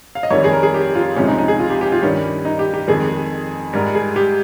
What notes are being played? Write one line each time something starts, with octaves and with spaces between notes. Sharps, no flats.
F5
D#5
F2 D#3 G3 C#5
G#4
A#4
G#4
G4
F4
C#2 C3 F3 G#3 C#4
D#4
D#4
G#4
F4
G4
G4
F4
G2 D#3 G3 C#4
D#4
G4
G4
F2 D#3 G#3 G#4
G#2 G3 A#4
G#4
G4